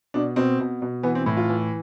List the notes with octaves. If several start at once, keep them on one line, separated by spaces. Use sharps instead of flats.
B2 D4
B2 C4
B2
B2
E3 B3
C4
A2
F4
E3